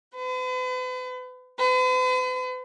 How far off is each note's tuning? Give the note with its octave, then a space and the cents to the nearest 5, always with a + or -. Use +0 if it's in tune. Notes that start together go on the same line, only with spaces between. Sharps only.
B4 +45
B4 +45